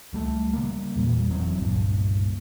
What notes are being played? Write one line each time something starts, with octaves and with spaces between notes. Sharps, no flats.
C#2 G3 A3
C#3 G3 A#3
E2 A#2 G3
F1 E2 F#3 C4
G1 C#2 G2 A#2